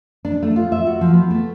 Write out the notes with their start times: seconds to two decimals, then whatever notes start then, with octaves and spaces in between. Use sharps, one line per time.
0.25 D4
0.42 A3
0.56 F4
0.72 E5
0.87 F#4
1.01 F3
1.13 B3
1.30 A3